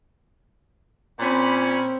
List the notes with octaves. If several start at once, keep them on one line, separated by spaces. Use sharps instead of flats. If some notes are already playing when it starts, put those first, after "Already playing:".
A#2 C4 C#4 B5